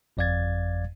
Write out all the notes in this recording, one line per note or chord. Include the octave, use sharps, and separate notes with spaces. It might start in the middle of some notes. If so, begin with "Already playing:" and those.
G1 F2 D5 F5 G#6 A6